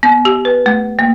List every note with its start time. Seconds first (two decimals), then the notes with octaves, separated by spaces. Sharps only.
0.03 B3
0.25 G4
0.45 B4
0.66 A3
0.99 A#3